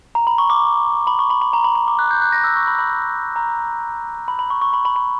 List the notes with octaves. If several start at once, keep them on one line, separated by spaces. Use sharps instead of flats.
A#5
B5
C#6
D6
B5
C#6
B5
B5
A#5
B5
B5
D6
F#6
G6
F#6
A#6
E6
C#6
B5
B5
A#5
B5
B5
C#6
C#6
B5
B5
B5